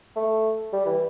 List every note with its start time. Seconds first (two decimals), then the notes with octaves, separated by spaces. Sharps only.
0.16 A3
0.73 G3
0.86 E3